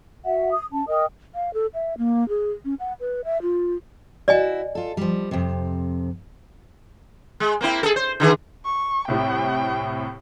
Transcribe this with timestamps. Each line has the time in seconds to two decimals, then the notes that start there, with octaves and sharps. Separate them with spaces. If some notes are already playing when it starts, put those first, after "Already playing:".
0.24 F#4 E5 F#5
0.52 D#6
0.71 C#4 A5
0.88 A#4 D#5 G5 D#6
1.35 F5
1.54 A4
1.74 E5
1.98 A#3
2.29 G#4
2.65 C#4
2.80 F#5
3.00 B4
3.25 E5
3.42 F4
4.28 E4 F#4 D5 D#5 G#5
4.75 F4 A4
4.97 F3 G3
5.31 F2 C3
7.40 G#3
7.61 A#3 C4 E4
7.83 G#4 A4
7.96 C5
8.20 D3 D#3 G#4
8.65 C#6
9.08 C2 A2 C3 G5